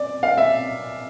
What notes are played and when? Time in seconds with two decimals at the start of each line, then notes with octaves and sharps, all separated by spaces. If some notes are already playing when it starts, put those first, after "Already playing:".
Already playing: D5
0.23 F5
0.37 E5